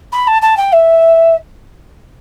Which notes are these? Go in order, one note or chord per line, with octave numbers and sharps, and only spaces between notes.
B5
A5
A5
G5
E5